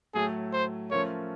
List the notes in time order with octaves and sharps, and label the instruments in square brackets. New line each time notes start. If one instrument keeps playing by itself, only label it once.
[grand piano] A2 F#3 A3 [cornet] G#4
[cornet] C5
[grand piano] F3 A3 C#4 F4 A#4 [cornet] C#5